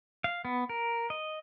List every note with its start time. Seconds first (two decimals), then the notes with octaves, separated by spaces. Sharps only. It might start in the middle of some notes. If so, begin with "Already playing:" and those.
0.24 F5
0.45 B3
0.69 A#4
1.10 D#5